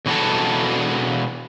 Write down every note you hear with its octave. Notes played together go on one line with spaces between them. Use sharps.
B2 E3 F#4 A4